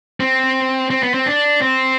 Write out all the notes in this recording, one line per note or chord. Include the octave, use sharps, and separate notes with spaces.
C4
C4
B3
C4
D4
C4